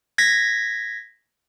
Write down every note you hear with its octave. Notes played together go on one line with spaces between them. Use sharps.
G#6 A#6 B6